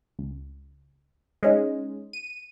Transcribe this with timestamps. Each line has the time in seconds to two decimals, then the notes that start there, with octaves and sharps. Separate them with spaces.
0.19 C#2
1.43 G#3 C#4 D#4
2.13 D#7